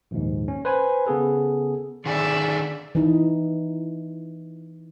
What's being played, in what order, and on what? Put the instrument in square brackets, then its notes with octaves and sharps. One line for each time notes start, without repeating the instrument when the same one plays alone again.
[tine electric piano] A#1 D#2 G#2
C#4
B4 C5 G#5 B5
C#3 B3 G#4 A4
[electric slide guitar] D3 D#3 G#4 [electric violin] D5 E5
[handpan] E3 D#4